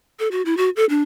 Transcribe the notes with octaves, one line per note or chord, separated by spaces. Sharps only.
A4
F#4
E4
F#4
A4
D4